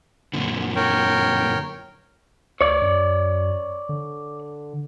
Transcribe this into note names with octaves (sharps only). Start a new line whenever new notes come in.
F#2 A#2 D3
A#4 C#5 G5
D2 C#5 D5
F#2
D3